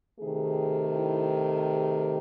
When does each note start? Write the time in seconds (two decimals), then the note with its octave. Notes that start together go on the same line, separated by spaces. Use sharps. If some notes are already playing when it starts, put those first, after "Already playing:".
0.20 C3 D#3 A3 G#4
0.94 E4
1.69 G#4